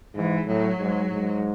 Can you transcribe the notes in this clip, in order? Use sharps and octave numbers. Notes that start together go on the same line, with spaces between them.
G#2 E3
A2 F#3
G#2
G#2